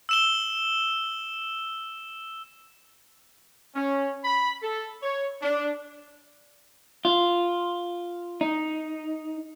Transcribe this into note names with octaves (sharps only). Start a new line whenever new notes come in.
E6 E7 G7
C#4
B5
A4
C#5
D4
F4
D#4